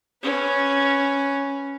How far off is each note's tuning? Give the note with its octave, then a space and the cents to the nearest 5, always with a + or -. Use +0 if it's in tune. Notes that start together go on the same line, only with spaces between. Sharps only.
C#4 +0 B4 +0